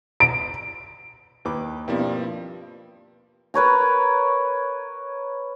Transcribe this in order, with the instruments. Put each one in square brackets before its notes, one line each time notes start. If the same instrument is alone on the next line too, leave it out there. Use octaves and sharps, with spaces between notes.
[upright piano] D7
[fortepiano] D#2 B4 D6
[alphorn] G2 [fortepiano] B2 E4 [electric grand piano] F3 A#3 C4
[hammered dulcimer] A#4 B4 C#5 A#5